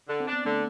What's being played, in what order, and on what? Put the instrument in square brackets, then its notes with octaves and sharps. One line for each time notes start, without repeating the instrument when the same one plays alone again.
[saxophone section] D3
[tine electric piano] C4
[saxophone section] D4
[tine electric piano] B3
[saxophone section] D3 [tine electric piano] A3